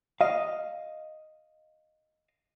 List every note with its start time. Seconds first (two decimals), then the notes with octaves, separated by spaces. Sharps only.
0.21 D#5 F5